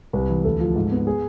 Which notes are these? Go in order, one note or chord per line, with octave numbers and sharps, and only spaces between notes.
C2 B4
E3
D2 A4
F3
G#2
B3
G#4